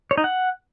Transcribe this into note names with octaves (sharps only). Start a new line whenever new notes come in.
C#5
D#4
F#5